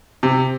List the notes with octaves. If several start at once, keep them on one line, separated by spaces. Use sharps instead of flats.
C3